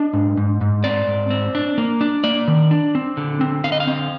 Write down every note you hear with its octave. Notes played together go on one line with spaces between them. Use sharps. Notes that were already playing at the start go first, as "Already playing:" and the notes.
Already playing: D4 D#5
G#2
G#2
G#2
C4 D5
G#2
C4
D4
A#3
D4
A#3 D5
D#3
D4
C4
D3
C4
D3 F5
D#5
F5
C4